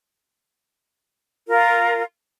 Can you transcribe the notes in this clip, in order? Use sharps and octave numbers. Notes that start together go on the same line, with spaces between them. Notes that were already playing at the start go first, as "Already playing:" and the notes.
F4 A#4